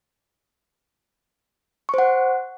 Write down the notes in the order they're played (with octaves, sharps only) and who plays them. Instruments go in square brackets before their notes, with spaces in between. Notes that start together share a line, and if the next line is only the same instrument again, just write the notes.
[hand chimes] C#6
C5
F#5